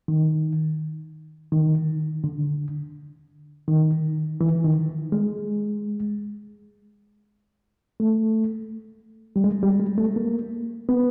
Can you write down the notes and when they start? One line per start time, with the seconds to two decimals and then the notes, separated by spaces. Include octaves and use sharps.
0.08 D#3
1.52 D#3
2.24 D3
3.68 D#3
4.41 E3
4.64 D#3
5.12 G#3
8.00 A3
9.36 G3
9.44 G#3
9.63 G3
9.80 G#3
9.98 A3
10.16 A#3
10.89 B3